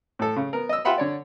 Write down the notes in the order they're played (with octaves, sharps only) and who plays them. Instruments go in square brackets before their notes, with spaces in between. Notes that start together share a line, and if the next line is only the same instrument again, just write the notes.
[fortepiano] A2 A4
C#3
B3 A#4
D#5 E6
F4 G4 E5 F#5 B5 C6
D3 C#5 D5